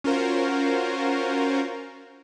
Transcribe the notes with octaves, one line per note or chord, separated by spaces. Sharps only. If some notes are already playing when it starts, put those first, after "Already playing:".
C#4 F4 F#4 A#4 C5